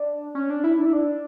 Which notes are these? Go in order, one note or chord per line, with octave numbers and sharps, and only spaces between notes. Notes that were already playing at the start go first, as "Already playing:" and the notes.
Already playing: D4
C#4
D4
E4
D4
E4
D4